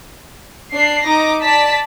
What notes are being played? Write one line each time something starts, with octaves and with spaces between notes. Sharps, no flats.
D4 C7
D#4 D6 A#6
D5 A5 B6